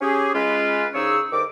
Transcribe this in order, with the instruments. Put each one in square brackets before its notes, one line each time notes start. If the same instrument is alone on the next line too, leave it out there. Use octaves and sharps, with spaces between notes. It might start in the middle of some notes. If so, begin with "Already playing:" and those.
[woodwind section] C#4 G4 G#4
G#3 C#4 F4 B4
C2 C#3 D#4 G#4 C#5 E6
G2 D#3 A4 C5 D6